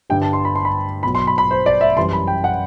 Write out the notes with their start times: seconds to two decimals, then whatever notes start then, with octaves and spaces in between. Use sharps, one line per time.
0.10 G2 D3 G3 G5
0.22 A5
0.33 C6
0.45 B5
0.55 C6
0.65 B5
1.03 B2 F#3 B5
1.15 C6
1.27 B5
1.38 B5
1.51 C5
1.66 D5
1.81 E5
1.97 F#2 E3 G3 C6
2.13 B5
2.28 G5
2.44 F#5